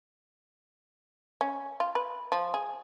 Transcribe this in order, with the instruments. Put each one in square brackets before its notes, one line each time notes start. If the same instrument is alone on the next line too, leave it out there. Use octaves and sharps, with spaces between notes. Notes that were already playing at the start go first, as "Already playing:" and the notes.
[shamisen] C#4
F4
B4
F3
G#4